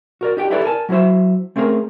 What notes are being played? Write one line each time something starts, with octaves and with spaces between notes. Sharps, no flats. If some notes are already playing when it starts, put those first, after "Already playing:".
F#4 A#4 D5
D#4 G4 G5
D#4 E4 G4 A4 B4 D5
A#4 G#5 A5
F#3 E4 F#4 C5 E5
A3 C4 C#4 G#4 A#4